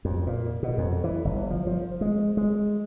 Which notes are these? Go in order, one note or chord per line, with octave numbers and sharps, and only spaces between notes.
F2
A#2
B2
F2
E3
G1
F3
F3
G#3
G#3